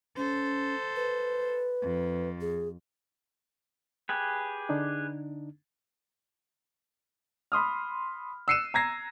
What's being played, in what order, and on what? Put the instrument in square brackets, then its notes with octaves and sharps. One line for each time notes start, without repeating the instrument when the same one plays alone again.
[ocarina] C#4 [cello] A4 C5
[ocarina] B4
[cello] F2
[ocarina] G#4
[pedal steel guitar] G4 G#4 B4 [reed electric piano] G5
[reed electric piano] D3 D4 D#4
[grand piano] B5 C6 D#6 F6
E6 F#6 C7 C#7 D#7 E7
A#5 G#6 A#6 C7